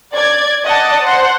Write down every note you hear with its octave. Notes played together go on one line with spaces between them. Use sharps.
D5 G#6
D5 D#5 F#5 A5
C5 F#5